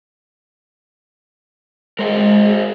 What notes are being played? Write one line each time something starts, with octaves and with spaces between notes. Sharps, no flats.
G#3 A#4 C5 D#5